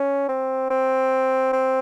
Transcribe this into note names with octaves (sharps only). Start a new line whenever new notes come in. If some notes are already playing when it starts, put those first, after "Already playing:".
Already playing: C#4
C4
C4
C4